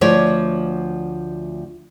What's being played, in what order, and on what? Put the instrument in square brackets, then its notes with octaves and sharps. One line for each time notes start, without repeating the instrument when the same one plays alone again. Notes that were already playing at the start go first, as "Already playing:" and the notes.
[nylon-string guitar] D2 F3 C#5 D5